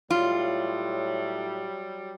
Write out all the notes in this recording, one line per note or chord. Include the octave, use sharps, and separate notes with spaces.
A2 F#3 G3 F4